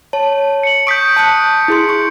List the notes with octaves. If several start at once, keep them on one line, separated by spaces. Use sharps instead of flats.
C#5 A5
C#7 F#7
C#6 D#6 G6 B6 D7
A5 D#6 F#6 C#7
E4 G#4 C6
C#6